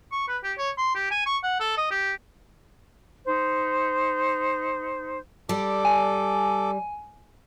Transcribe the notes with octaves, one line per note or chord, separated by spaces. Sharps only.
C#6
B4
G4
C#5
C6
G4
G#5
C#6
F#5
A4
D#5
G4
D#4 C5
G3 A4 D5 D6
G#5